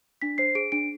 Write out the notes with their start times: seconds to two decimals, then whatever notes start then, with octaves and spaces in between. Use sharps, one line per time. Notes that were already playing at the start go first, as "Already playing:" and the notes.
0.22 D4 B6
0.38 C5 C7
0.55 G#4 D7
0.72 D4 D7